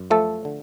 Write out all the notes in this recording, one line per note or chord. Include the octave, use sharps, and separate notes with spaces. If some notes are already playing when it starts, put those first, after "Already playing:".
Already playing: F#2
F3 A3 A4
D3